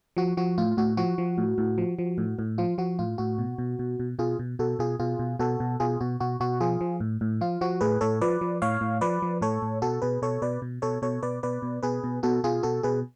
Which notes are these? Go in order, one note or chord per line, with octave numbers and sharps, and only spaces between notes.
F3 F#4
F3 F#4
A2 F4
A2 F#4
F3 F#4
F3
A2
A2
F3
F3
A2
A2
F3 F4
F3 F#4
A2 F4
A2 F#4
B2
B2
B2
B2
B2 F4 G#4
B2
B2 F#4 A4
B2 F4 G#4
B2 F4 G#4
B2
B2 F#4 A4
B2
B2 F4 G#4
B2 F#4
B2 F#4
B2 F#4
F3 F4 G#4
F3
A2
A2
F3 F4
F3 F#4
A2 G#4 B4
A2 A4 C#5
F3 B4 D5
F3
A2 C#5 F5
A2
F3 B4 D5
F3
A2 A4 C#5
A2
B2 F#4 A4
B2 G#4 B4
B2 A4 C#5
B2 B4 D5
B2
B2 A4 C#5
B2 A4 C#5
B2 B4 D5
B2 B4 D5
B2
B2 G#4 B4
B2
B2 F#4 A4
B2 F4 G#4
B2 F#4 A4
B2 G#4 B4